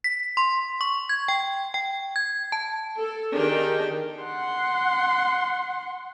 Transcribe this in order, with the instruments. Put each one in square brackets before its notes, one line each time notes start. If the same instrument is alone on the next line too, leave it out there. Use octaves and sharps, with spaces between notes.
[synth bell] B6
C6
C#6
G#6
G5
G5
G#6
A5
[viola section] A4
D#3 D4 G4 G#4 A#4 G5
[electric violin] F#5 C6